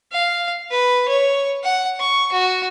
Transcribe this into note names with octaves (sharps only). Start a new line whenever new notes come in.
F5
B4
C#5
F#5
C#6
F#4